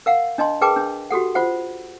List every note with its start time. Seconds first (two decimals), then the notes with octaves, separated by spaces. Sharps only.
0.06 A#4 F5 F#5
0.38 D4 D#5 A5 C6
0.61 G#4 A#4 B4 G5 A5 D6
0.76 D4
1.10 F#4 G4 A4 F#5
1.35 F4 C5 F#5